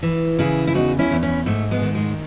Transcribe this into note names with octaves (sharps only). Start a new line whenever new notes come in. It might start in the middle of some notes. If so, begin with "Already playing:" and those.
E3
C#3 E4 G#4
E4
E2 D#4 F#4
C#4 E4
E2
C#4 E4
G#2 A3
G#3 B3
D#3
G#3